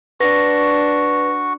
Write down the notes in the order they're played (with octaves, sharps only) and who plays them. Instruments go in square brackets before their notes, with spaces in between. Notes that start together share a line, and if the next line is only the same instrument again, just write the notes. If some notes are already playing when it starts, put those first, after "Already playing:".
[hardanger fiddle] D4 [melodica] F#4 C#6 [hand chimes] B4 A#6